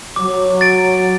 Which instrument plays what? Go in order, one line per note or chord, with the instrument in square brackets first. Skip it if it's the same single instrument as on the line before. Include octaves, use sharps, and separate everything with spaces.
[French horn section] F#3 [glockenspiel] D6
[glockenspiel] A6 D7